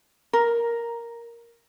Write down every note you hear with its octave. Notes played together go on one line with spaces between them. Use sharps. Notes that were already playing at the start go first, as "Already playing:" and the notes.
A#4